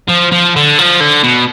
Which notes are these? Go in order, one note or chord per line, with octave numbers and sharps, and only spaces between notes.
F3
F3
D3
F3
D3
B2